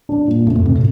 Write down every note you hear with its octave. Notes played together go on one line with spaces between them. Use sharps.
D4
A#2
G2 A3
F2
G2 C3
A2